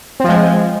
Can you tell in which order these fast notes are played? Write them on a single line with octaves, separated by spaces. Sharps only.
C4 F3 G#3